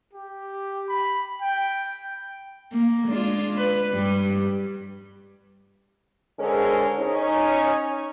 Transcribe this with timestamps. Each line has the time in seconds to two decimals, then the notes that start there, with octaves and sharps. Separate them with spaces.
0.13 G4
0.89 B5
1.42 G5
2.72 A#3
3.07 G#3 D4 F4
3.57 B4
3.91 G2 G3
6.40 D3 G#3 C#4 G#4 A#4 C5
6.99 C#4 D#4